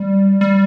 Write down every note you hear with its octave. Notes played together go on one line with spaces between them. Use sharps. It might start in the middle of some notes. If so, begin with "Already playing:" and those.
Already playing: G3
G3